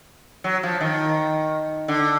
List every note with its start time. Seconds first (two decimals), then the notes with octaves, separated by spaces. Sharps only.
0.44 F#3
0.63 F3
0.81 D#3
1.88 D3